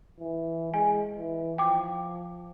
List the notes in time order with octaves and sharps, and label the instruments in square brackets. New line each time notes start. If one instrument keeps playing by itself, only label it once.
[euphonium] E3
[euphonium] G#3 [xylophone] G#5
[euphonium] E3
[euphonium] F3 [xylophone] G5 D6